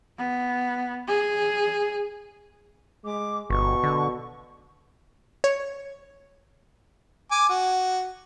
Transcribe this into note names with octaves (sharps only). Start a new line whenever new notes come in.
B3
G#4
G#3 D6
G1 B2 C#6
D3
C#5
G#5 D6
F#4